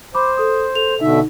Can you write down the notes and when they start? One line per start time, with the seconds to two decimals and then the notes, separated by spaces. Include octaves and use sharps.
0.15 C5 B5 D6
0.37 A4 D#6
0.75 A4 F7
1.01 B2 D3 D#4 E5